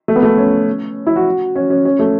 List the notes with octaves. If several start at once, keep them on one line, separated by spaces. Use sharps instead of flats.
A3
B3
A3
C#4
E4
F#4
C#4
C#4
C#4
A3